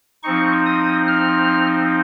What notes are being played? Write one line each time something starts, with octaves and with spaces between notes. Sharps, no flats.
F3 C4 D#4 C#6
D#6
F6